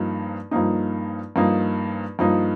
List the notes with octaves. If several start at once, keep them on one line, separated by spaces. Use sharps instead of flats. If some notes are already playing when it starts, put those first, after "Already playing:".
Already playing: G2 F3 A#3 D#4
G2 F3 A#3 D#4
G2 F3 A#3 D#4
G2 F3 A#3 D#4